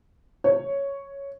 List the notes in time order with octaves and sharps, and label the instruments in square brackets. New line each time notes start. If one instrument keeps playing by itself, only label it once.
[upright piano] C#5